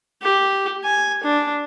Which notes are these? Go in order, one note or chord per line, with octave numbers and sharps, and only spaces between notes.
G4
G#5
D4